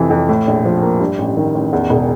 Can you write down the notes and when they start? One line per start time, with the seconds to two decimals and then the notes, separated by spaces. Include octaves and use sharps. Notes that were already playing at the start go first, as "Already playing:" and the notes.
Already playing: F2 C3 E3
0.10 F2
0.29 A2
0.47 A#1
0.65 F3
0.82 A#3
1.00 G2
1.18 A1
1.37 D#3
1.55 A1
1.73 E2
1.90 E1